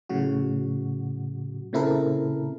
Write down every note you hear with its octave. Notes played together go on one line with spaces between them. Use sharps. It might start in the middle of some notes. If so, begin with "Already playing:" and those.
A2 C#3 F#3 F#4
A#2 C#3 C4 E4 A4 A#4